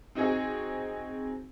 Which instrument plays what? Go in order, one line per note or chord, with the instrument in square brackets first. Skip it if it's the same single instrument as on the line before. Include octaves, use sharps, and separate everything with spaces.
[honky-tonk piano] C4 D#4 F#4 G#4